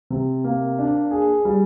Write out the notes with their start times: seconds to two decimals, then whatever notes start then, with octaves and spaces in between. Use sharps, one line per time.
0.10 C3
0.44 A#3
0.79 D4
1.11 G#4
1.45 G3